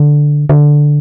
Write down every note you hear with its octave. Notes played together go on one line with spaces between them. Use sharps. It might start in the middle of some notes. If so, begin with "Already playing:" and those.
Already playing: D3
D3